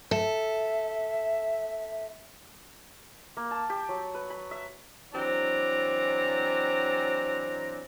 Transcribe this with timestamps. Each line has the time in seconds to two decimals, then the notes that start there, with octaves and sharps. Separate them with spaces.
0.11 A4 E5
3.37 A#3
3.51 A5
3.70 G4
3.89 F#3
4.15 B4
4.30 B5
4.51 E5
5.13 E3 F#3 C4 D4 D5 A#5